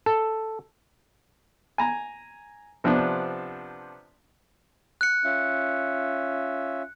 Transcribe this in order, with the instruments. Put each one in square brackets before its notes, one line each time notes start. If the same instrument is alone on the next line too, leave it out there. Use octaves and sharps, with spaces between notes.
[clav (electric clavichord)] A4
[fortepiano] G#5 A#5
C3 F3 B3 D4
[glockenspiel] F#6 C#7
[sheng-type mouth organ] C#4 F4 E5